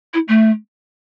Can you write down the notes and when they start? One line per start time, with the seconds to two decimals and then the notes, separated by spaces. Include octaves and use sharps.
0.14 E4
0.28 A3